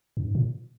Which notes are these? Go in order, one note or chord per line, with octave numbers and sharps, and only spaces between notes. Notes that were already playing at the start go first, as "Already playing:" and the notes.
F#2
G#2
A#2